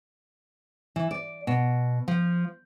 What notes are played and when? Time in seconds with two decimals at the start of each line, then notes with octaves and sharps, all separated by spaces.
0.96 E3
1.11 D5
1.47 B2
2.08 F3